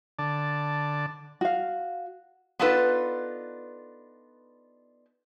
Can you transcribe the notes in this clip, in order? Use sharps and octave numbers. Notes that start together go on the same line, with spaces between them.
D3 D5 A5
F#4 F5
B3 D4 D#4 F4 A4 B4